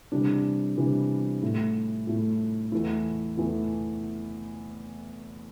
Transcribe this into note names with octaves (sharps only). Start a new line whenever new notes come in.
C3 E3 G3 D4
C3 E3 G3 D4
A2 A3 E4
A2 A3 E4
E2 E3 A3 E4
E2 E3 A3 E4